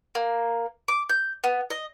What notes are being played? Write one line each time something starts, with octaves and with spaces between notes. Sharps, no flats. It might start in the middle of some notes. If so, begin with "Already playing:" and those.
A#3
D6
G6
B3
D#5